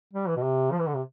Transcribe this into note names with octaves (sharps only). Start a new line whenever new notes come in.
G3
E3
B2
C3
F3
E3
D3
C3